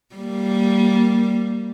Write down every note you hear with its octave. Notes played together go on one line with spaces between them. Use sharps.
G3 A#3